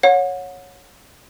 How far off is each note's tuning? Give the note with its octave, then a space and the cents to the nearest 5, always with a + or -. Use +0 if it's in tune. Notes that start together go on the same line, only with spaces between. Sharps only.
C#5 +0 F#5 -30